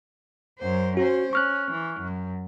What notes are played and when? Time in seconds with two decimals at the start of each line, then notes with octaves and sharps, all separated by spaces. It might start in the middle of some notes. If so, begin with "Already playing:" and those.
0.60 F#2 C5
0.97 C#4 F#4 C5
1.33 C#4 C#6 F6 F#6
1.71 E3
2.00 F#2